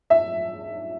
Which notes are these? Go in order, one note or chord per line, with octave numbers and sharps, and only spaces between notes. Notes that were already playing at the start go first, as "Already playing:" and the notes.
E5